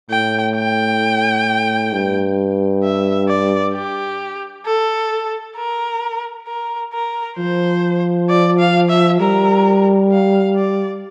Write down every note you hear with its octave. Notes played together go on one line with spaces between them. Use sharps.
A2 G5
G5
G2
E5
D5
G4
A4
A#4
A#4
A#4
F3 C5
D5
F5
E5
G3 A#4
F5
D5